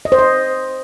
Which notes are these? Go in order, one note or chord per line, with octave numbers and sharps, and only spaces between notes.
D#5
C5
D#5